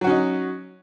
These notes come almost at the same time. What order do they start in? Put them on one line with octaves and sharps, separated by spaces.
F#3 F#4 C#4 D#4